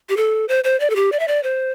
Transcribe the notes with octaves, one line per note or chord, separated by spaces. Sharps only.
G4
A4
C5
C5
D5
A4
G4
D5
E5
D5
C5